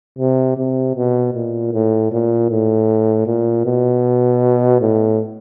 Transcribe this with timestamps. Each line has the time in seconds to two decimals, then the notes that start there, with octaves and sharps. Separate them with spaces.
0.18 C3
0.57 C3
0.95 B2
1.34 A#2
1.73 A2
2.12 A#2
2.50 A2
3.26 A#2
3.65 B2
4.81 A2